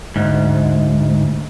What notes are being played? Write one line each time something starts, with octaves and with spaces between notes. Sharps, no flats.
D2 G#2